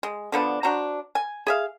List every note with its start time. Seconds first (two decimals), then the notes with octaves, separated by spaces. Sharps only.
0.03 G#3
0.32 D3 F3 B3 D4
0.63 D4 F#4 C5 A#5
1.15 G#5
1.47 G#4 E5 F5